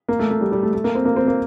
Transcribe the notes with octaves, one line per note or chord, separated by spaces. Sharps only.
A#3
A3
A3
G3
G3
A3
A3
A#3
C4
A#3
C4
A#3